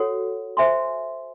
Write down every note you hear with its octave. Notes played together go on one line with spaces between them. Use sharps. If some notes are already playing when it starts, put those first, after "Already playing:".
Already playing: F#4 A4 C#5 F#5
C5 E5 G#5 C6